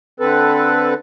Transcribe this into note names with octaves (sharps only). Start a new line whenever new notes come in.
D3 C4 A4 B4